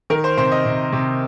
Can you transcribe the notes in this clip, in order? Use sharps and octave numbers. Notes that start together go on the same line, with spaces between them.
D#3 A#4
C5
C3 C5
D#5
C3
C3